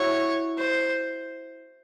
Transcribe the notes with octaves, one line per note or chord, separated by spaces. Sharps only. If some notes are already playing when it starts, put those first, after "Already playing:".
Already playing: E4 F#4 C#5
C5